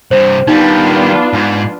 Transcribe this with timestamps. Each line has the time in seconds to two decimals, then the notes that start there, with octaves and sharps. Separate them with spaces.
0.11 G2 C3 C5
0.48 D#3 G3 B3 D4 D#4 F4
1.33 G#2